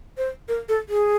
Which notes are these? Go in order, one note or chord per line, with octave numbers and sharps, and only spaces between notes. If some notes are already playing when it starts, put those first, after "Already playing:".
C5
A#4
A4
G#4